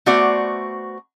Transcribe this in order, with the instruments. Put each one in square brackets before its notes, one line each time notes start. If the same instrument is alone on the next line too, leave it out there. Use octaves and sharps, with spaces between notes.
[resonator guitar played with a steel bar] A3 B3 F#4 C5 D5